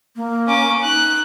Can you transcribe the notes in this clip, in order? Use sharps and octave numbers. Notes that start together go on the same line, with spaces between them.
A#3
C#4 D6
D#4 F#6